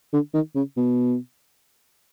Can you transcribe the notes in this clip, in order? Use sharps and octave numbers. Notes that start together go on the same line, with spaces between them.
D3
D#3
C#3
B2